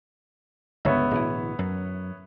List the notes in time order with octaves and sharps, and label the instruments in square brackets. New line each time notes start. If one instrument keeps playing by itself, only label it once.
[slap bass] G1 C#2 [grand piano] B3 C#5 E5
[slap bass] D1 B2 E3
F#2